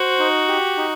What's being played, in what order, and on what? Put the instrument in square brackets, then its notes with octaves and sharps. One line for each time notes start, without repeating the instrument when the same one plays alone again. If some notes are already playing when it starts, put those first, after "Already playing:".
Already playing: [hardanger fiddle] F#4 [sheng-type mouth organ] C5
[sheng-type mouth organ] D#4
G4
D#4